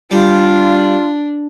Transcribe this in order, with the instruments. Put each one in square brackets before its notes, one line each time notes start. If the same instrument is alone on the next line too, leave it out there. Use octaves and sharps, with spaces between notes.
[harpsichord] G3 [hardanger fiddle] D4 [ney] F4